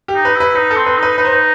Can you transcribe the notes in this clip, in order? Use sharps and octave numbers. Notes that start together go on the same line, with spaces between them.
G4
D#4
B4
E4
B4
D#4 B4
A4
C4
B4
D#4
B4
D#4 B4
C5
B4